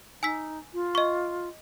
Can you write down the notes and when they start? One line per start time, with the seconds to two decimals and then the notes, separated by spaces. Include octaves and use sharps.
0.23 D#4 G#5 E6 B6
0.74 F4
0.95 D#5 C#6